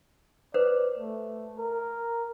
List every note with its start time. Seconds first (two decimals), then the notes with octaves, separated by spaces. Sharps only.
0.54 B4 C5 D5
0.98 A3
1.58 A#4